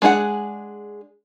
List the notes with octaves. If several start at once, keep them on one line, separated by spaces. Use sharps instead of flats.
G#3 D4 G#4 A4 F#5